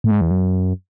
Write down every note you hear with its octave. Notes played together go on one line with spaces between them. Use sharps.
A2
G#2
E2
F#2